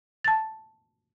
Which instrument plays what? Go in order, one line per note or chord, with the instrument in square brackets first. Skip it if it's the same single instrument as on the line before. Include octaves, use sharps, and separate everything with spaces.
[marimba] A5 A6